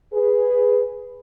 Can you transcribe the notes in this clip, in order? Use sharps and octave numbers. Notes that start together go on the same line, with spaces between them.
G#4 B4